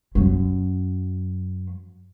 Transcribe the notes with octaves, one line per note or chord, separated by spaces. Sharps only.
F#2 F#3